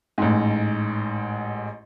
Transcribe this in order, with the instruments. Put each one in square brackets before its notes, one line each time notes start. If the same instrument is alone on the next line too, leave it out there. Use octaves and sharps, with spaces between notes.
[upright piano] A1 G#2